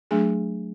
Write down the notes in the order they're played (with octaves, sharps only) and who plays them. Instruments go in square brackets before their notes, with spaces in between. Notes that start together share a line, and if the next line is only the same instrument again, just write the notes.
[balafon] F#3 A3 D4 G#4